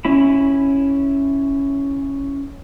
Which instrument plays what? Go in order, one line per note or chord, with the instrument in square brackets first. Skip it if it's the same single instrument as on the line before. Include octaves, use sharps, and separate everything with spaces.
[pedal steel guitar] C#4 E4 B5